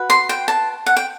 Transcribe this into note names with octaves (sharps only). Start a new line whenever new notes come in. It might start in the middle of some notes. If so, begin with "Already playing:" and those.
Already playing: F#4 B4
C6
G5
A5
F#5
G5